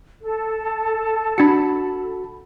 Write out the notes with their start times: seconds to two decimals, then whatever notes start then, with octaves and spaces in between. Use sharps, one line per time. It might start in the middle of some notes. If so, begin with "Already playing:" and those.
0.21 A4
1.38 D4 F#4 A5 B5 C#7